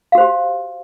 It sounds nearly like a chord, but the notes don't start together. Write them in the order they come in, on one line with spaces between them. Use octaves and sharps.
F5 F#4 C5 G4